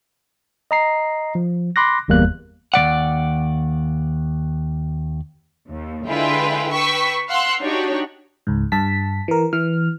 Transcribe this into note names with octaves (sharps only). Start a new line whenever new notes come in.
D#5 A#5 C7
F3
B5 C6 D6 F#6 A#6
G1 E2 G3 A#3 F#6
D#2 E3 D5 F#5
D#2
D3 G#3 E4 F4 B4 G5
B4 G5 C#6 E6 B6
F5 F#5 C6 E6 F#6
D4 D#4 F#4 G4 C#5
C#2 G#2
G2 A5 B6
E3 A#4
E3 F6